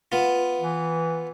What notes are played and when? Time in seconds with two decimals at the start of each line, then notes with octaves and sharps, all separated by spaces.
0.12 B3 F4
0.60 E3